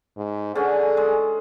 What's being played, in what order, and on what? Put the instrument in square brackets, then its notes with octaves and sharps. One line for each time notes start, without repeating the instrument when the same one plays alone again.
[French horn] G#2
[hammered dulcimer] D3 C#4 [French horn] G#4
[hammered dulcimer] G#3